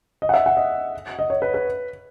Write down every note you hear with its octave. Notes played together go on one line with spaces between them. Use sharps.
D#5
F#5
E5
F#5
D#5
D#5
C#5
B4
B4